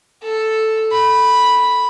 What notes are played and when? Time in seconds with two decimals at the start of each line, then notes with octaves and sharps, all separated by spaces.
0.23 A4
0.92 B5